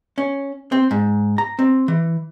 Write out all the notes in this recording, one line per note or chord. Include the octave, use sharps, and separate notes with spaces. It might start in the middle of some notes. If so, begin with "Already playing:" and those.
C#4
C4
G#2
A#5
C4
E3